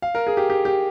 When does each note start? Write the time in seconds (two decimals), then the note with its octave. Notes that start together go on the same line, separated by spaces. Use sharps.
0.02 F5
0.15 A#4
0.27 G#4
0.37 G4
0.50 G4
0.65 G4